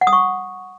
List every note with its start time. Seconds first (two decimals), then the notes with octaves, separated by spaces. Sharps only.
0.01 F#5
0.07 D#6
0.13 C#6